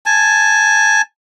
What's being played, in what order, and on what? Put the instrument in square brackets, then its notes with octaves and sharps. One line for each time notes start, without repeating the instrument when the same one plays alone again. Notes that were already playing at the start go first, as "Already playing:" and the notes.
[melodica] G#5 A5